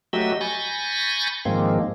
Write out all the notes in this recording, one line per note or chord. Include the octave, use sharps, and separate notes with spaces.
F#3 A3 F#4 G4 D#5 E6
G#5 B5 C#6 G6 A6 A#6
G#2 D#3 F3 G#3 A#3 C4